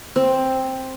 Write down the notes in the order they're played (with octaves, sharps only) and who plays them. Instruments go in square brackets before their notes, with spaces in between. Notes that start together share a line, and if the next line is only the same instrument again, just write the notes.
[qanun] C4